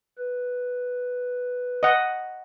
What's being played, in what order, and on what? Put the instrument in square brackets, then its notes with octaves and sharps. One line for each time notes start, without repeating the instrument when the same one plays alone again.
[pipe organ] B4
[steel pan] D#5 F#5